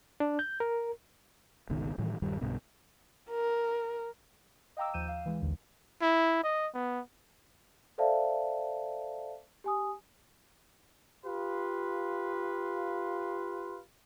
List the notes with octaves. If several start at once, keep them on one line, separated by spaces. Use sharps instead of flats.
D4
G6
A#4
G1 C#2 B2 D#3
A2 D#3 E3 G3
D#1 G2 D#3 G3
B1 G2 B2 D3
A#4
D#5 F5 G5 A#5 D6 E6
D#2 F3 G6 D#7 E7
F5
E3 G#3
A1 D#2 D3
E4
D#5
B3
A4 C5 D5 E5 F5 A5
G4 G#5 D#6
F4 G4 B4 F5 C6